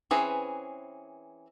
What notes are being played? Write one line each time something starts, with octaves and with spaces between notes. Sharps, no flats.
E3 C4 C#4 G#4 B4